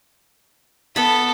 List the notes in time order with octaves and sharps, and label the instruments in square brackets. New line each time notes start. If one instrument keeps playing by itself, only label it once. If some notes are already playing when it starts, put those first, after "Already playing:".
[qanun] B3 B5 [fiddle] A4